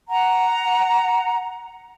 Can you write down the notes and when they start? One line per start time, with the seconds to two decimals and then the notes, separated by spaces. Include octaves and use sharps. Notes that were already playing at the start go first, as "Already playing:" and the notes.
0.09 F#5 A#5